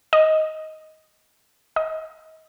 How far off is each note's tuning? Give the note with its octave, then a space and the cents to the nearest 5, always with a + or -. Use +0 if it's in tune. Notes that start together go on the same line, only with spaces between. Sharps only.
D#5 +10
D#5 +35